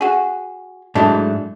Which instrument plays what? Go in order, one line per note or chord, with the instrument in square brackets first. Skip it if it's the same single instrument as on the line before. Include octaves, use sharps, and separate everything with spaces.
[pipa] F#4 G#4
[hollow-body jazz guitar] G#2 F#3 A3 [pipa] D4 E4